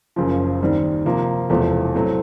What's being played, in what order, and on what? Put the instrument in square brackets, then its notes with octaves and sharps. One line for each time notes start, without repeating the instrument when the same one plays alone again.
[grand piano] F#1 F#2 C#3 F3
D#2 D#3 G3 C4
C3 F3 A#3
E1 E2 C3 F3 A3
A2 F#3 A3 C4